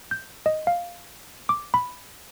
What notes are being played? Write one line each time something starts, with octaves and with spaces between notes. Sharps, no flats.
G6
D#5
F5
D6
B5